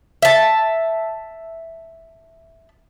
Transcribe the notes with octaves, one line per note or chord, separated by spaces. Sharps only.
E5 A5